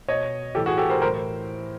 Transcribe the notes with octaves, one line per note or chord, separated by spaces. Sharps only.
B2 C#5 D#5
A2 E3 G4 A4
F#4 G#4
G4 A4
A#4 C5
A2 E3 A#4 C5